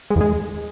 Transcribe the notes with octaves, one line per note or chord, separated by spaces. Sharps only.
G#3
E2
G#3